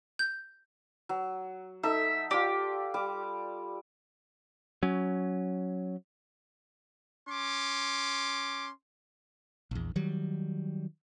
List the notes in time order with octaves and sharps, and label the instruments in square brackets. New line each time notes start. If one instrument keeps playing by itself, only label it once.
[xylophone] G6
[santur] F#3
[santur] D#4 A4 [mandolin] E5
[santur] F4 D5 [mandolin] G4
[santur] G3 D6
[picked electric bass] F#3 C#4
[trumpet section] C#4 C6 D6
[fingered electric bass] A#1 E2
D#3 F#3 G3